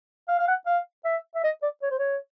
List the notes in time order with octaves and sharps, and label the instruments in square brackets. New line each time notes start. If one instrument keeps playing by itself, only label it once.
[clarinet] F5
F5
F#5
F5
E5
E5
D#5
D5
C#5
C5
C#5